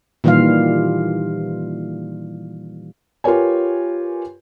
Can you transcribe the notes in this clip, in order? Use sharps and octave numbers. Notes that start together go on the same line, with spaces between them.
A#2 D#3 E3 G3 F4 F5
F4 G4 A#4 B4 C#5 G#5